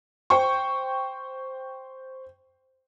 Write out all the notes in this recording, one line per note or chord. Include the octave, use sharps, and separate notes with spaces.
C5 G5 C#6